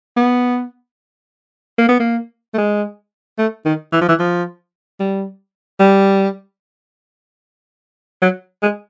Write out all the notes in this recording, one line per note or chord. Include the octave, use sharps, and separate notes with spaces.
B3
A#3
B3
A#3
A3
G#3
A3
D#3
E3
F3
E3
F3
G3
G3
F#3
G#3